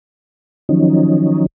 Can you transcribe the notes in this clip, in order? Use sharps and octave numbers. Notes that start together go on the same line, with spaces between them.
D#3 F3 F#3 C#4 D#4